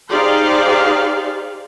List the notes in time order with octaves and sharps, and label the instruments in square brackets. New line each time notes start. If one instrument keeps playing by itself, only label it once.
[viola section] D#4 G4 G#4 C5 D5 F5